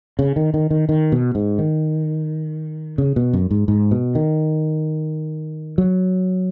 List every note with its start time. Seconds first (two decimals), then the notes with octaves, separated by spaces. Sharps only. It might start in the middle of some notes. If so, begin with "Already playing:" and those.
0.19 C#3
0.36 D#3
0.54 D#3
0.70 D#3
0.89 D#3
1.12 B2
1.35 G#2
1.59 D#3
2.98 C#3
3.16 B2
3.33 F#2
3.51 G#2
3.68 G#2
3.91 B2
4.15 D#3
5.78 F#3